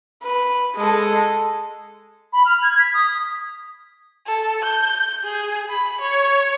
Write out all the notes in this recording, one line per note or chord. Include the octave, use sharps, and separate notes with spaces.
B4
G#3 A4
B5
F6
G#6
B6
D#6
A4
G6
G#4
B5
C#5